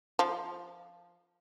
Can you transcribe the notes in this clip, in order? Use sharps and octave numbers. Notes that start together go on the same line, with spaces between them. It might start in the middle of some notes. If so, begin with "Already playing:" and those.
F3